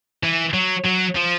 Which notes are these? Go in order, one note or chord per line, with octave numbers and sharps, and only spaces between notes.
E3
F#3
F#3
F3